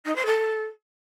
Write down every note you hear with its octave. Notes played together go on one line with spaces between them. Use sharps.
D#4
C5
A4